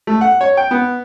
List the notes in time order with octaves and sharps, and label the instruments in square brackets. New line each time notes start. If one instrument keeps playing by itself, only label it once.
[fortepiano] A3
F#5
C#5
G5
B3